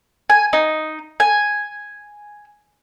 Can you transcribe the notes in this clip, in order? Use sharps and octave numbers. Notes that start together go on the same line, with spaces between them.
G#5
D#4
G#5